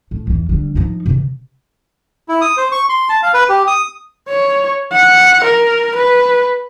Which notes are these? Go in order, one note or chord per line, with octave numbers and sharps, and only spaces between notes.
A2
E2 E3
D3 G3
F3 D#4
C3 E3
E4
D#6
C5
C#6
C6
A5
F5
B4
G4
D#6
C#5
F#5
A#4
B4